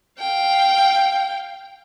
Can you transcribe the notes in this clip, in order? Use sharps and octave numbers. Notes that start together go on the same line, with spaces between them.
F5 G5